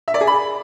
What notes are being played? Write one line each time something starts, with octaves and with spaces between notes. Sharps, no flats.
E5
D5
G#4
B5